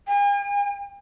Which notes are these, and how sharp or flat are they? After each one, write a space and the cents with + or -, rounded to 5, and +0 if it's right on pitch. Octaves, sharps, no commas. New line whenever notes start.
G#5 -45